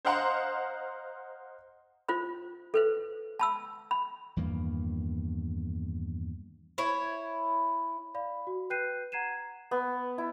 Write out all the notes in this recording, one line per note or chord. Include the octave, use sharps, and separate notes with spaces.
C5 D#5 F5 F#5 A#5 C6
F4 C5 B5
A4 B4 C5
A5 B5 E6
B5
E2 G2 D#3 A#3
E4 C#5
D5 F5 B5
F#4
B4 G5 F#6 G6 C7 D#7
F#5 A#5 G#6 C7 D#7 E7
B3
E4